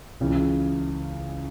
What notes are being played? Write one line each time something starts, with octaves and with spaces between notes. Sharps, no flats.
C#2 C#3 E3